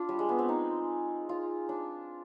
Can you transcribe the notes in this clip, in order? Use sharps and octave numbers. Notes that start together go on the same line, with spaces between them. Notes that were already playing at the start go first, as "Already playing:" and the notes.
Already playing: D4 F4
G3
G#3
B3
C4
D#4
F4
D4